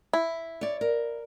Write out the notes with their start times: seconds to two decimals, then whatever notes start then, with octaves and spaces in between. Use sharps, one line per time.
0.13 E4
0.61 C#5 D5
0.81 A#4